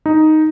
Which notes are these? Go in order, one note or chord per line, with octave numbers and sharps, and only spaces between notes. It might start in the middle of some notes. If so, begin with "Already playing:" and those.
D#4